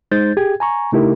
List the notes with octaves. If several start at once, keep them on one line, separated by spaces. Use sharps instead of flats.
G#3 D#4 C5 G6 A6
G4 G#4 G5 G#6
G#5 A#5 C#6
C#3 A3 D#4 E4 G4 A#4